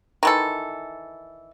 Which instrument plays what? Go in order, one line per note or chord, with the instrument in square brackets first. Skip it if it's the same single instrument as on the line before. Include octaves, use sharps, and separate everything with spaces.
[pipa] D#3 E3 A4